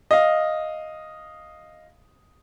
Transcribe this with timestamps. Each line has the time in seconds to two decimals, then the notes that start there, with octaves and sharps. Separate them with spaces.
0.11 D#5 F5